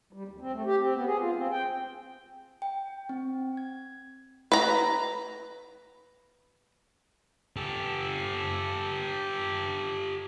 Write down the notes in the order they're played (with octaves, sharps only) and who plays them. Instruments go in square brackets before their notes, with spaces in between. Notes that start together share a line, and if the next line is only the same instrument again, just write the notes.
[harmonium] G3
D#2
C4
A3
G4
C4
B3
G#4
F4
C4
G5
[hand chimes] G5
C4
G#6
[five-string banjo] B4 A#5
[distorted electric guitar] G4 A4